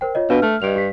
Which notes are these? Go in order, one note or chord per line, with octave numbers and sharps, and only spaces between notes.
A#4 C5 G5
F4 C#5 D#5
B2 D4 B4 F5
A3 F6
G2 D#5 D7 F7
G4 B6